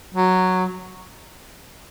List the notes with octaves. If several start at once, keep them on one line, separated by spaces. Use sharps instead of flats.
F#3